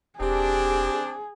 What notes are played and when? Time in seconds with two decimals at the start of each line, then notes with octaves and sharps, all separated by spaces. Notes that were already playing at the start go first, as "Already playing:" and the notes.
0.20 E1 C4 D4 G4 G#4